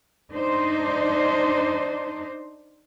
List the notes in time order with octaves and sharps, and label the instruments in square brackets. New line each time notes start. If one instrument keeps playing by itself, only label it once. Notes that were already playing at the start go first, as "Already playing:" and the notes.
[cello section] D4 D#4 C5